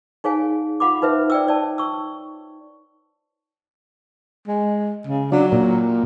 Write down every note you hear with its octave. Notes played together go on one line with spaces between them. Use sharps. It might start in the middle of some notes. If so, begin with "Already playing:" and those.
D#4 G#4 C#5 F5 G#5
F4 F5 F#5 B5 D6
D#4 B4 C5 E5
D5 G5 E6
C#5 D5 A5
C#6 E6
G#3
C#3
F#3 D4
A#2